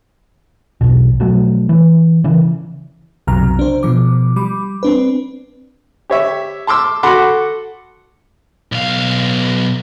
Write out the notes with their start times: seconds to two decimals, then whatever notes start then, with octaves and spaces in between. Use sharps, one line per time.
0.81 B1 E2 B2
1.20 B2 F3 F#3 A3
1.69 E3
2.24 C#3 E3
3.27 B1 F2 C3 F#3 A#5 F6
3.59 D4 C5
3.83 B2 F3 D6
4.36 G3 B5 D6
4.83 C4 D4 B4
6.10 G4 C#5 E5
6.67 A5 C6 D6 E6
7.03 F#4 A4 F#5 B5 C6 D6
8.72 B1 F5